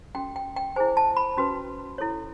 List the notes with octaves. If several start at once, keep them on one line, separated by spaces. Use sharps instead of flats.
C#4 F#4 A4 G5
G5
G5
E4 G#4 C5 G#5
A5
B5
C#4 F#4 B4
E4 A4 C#5